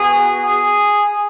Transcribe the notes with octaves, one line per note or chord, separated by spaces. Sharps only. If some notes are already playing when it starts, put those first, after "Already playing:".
Already playing: B3 F#4 G#4
G#4